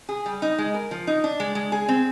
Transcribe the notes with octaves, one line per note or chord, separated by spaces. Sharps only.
G#4
G3
D#4
G#3
A#4
F3
D#4
D4
G#3
G#3
G#4
C4